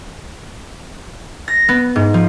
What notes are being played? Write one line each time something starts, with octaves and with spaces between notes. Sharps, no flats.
A#6
B3
G#2
F3